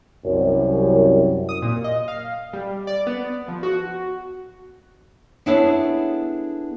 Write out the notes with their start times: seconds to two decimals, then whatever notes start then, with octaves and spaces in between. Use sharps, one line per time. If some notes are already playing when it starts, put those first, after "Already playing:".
0.24 C2 F#2
1.49 D#6
1.62 A#2
1.84 D#5
2.08 F5
2.53 G3
2.87 D5
3.07 B3
3.48 F3
3.63 F#4
5.46 B3 D4 E4 G#4 A4 C#5